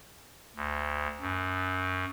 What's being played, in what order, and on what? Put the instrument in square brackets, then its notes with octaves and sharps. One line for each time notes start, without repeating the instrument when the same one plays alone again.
[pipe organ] D2
F#2